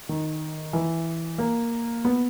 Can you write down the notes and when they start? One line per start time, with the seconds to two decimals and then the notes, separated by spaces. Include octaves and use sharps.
0.09 D#3
0.73 E3
1.38 A#3
2.05 B3